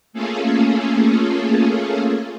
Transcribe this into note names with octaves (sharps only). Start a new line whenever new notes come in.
A3 A#3 C#4 F4 G#4 A4